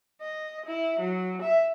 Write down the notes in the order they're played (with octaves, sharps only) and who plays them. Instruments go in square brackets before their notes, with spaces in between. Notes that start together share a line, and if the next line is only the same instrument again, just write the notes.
[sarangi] D#5
E4
F#3
E5